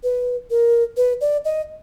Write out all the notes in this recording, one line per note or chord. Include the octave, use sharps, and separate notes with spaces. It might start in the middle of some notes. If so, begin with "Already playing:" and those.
B4
A#4
B4
D5
D#5